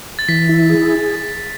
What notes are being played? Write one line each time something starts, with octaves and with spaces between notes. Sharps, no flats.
A6
E3 B6
E4
G#4